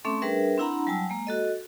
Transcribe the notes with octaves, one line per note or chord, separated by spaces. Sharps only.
A3 C4 C#4 A4 E5 D6
G3 D4 G#4 A#4 B4 E5
C4 D4 E4 F#5 A#5 B5
F#3 G3 G#5 A5 E6
G#3 A#3
F#4 A4 D#5